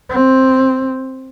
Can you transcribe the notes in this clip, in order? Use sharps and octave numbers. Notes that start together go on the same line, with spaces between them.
C4